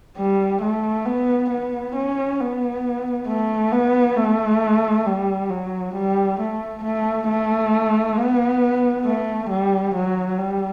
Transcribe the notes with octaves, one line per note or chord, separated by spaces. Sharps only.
G3
A3
B3
B3
C#4
B3
A3
B3
A3
G3
F#3
G3
A3
A3
A3
B3
A3
G3
F#3
G3